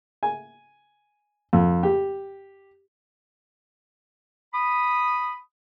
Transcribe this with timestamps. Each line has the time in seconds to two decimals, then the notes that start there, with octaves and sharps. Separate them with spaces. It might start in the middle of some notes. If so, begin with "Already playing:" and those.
0.23 G#5
1.53 F2
1.83 G4
4.53 B5 D#6